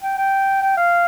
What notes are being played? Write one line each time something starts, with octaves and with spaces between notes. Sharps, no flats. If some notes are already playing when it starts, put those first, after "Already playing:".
G5
G5
G5
F5